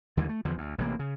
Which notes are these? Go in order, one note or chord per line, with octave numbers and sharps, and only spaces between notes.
D#2 D3 E3 G#3
A3
E2 D3 F3
D2
A1 C3 D#3 A#3
C#3